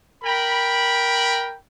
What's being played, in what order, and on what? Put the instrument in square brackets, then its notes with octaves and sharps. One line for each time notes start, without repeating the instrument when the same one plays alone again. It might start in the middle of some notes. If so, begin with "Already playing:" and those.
[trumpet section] A#4 G5 B5